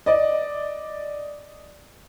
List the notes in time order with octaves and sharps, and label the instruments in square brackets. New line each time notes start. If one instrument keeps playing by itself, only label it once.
[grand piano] D5 D#5